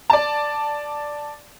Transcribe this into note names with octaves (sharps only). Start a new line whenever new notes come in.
D5 A5